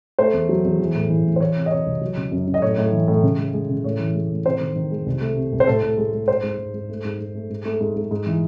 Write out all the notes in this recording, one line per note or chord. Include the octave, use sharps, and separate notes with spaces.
A3 C5
E2
F#3
E2
E3
A2
E3
A2
C5
E3 C#5
C3
D#5
C3 C#5
C2
F#3
C#3
F#2
F#2
D#5
A2 C#5
A2
E3
A2
C#3
G#3
G#3
C#3
A2 C#5
E3
G#3
A2
C3 C5
D#3
D#3
G#3
C2
A3
C3
C2
C5
A2 A4
A2
G#3
G#3
G#2 C5
G#2
G#2
G#2
A3
G#2
G#2
A3
G#2
A3
G#2
G#2
G#2
E3